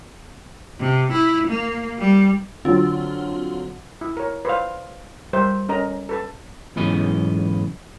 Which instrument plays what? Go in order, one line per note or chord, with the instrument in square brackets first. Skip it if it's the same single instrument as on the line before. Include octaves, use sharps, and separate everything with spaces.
[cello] C3
E4
A#3
G3
[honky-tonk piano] D3 F#3 [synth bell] C4 F4
[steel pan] E4
A#4 C#5
B4 C5 D5 F5
G3 A#4 C5 E5
C#4 A4 A#4 D#5 A#5
A4 B4 A5
[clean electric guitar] B1 G#2 E3 B3 C#4 D#5